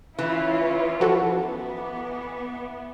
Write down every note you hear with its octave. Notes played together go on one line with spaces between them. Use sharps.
E3 C#4 E4 F4
F3 F#4 A4
B3